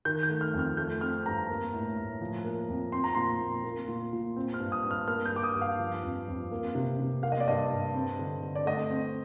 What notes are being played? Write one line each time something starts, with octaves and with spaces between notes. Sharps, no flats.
D#3 G6
G6
A3
F6
F2
F6
A3 G6
C4 F6
G2 A#5
A#3
A2
A2
F3
A#3
F2
C4 C6
A#5
A#2 C6
A#2
A#3
A#2
A#2
C4
F6
G2
D#6
G2
F6
A#3 F6
G6
G2 D6
D#6
G2
F5
F3
F2
F2
A#3
C3
C3
A#3 F5
D#5
D5
G2 D#5
G2
C4
D3
D3
D5
A3 D#5
C4